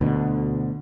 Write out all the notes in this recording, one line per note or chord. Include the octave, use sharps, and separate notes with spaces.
D2 B2 D3